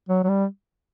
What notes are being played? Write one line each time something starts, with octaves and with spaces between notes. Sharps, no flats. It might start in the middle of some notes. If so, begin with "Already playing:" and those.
F#3
F#3
G3